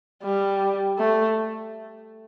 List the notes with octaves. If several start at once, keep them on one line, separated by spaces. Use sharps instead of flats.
G3
A3